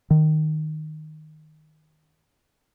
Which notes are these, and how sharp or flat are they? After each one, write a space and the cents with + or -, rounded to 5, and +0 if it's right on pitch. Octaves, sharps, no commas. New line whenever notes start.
D#3 -5